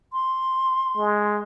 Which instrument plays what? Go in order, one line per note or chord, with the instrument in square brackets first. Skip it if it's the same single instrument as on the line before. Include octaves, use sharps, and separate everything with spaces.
[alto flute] C6
[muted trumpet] G#3